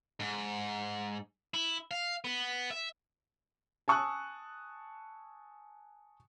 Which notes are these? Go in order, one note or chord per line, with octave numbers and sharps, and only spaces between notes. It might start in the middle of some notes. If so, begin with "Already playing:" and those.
G#2
E4
F5
B3
E5
G#5 A5 C#6 D#6 E6 F#6